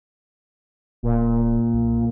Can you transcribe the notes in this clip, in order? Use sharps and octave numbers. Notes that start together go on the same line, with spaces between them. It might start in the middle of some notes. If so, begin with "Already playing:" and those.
D1 A#2
B1